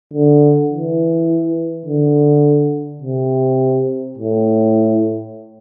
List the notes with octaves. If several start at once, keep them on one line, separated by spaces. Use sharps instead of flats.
D3
E3
D3
C3
A2